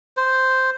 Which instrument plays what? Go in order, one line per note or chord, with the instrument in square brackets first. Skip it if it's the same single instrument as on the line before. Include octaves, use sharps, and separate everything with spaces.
[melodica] C5